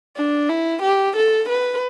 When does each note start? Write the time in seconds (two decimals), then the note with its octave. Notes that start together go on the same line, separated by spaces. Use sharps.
0.17 D4
0.49 E4
0.83 G4
1.16 A4
1.49 B4